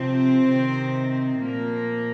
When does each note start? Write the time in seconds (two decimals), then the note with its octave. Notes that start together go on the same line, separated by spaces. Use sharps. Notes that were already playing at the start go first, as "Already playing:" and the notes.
Already playing: C3 F3 C4
0.48 C3 D#3
1.41 A#2 F3 A#3